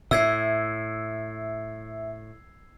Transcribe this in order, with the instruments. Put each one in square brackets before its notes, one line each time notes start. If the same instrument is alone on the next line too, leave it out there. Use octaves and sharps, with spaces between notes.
[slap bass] A2 [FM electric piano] E5 [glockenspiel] E6 G#6 C7